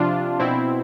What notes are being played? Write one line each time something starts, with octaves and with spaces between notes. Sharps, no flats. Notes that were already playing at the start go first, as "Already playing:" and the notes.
Already playing: C3 F3 D4 F4
B2 C4 E4